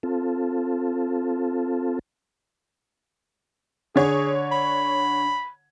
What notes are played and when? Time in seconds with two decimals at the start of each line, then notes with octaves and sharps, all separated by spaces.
0.03 C4 F4 A4
3.96 D3 G#4 C#5
4.51 B5